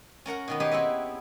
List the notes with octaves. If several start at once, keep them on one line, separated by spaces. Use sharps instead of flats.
C#4 A#4 F#5 A#5
B2 D#3 B3
D#4 G4 G#4 B4 C#5
B3 C4 E4 B4